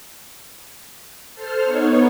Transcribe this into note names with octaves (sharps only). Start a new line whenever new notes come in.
A4 C5 F6
B3 D#4 C#5